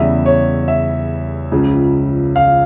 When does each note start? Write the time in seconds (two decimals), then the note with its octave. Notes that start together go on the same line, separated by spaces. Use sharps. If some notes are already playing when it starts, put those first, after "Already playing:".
Already playing: E2 C#3 G3 E5
0.26 C#5
0.68 E5
1.51 C#2 C#3 F3
2.36 F5